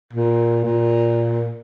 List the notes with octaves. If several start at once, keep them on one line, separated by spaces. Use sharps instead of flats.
A#2
A#2